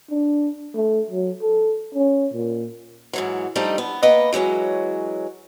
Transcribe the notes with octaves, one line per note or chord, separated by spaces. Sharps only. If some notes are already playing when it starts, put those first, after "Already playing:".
D4
A3
F#3
A4
C#4
A#2
G#2 E3 F#3
F3 G3 A3 D4 D#4
B3
A#3 B3 B4 D#5
E3 F#3 G#3 C#4